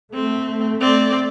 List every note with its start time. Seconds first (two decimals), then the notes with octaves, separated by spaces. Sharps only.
0.14 A3 C4
0.80 C4 D5